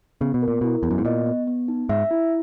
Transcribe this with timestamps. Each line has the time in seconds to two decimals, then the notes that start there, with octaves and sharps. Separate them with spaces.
0.21 C#3 B3
0.34 B2
0.42 A#4
0.48 A#2
0.61 B2 E4
0.83 E2 B3
0.91 F#2
0.98 G#2
1.05 A#2 D#5
1.26 B3
1.47 B3
1.68 D#4
1.89 G#2 E5
2.11 E4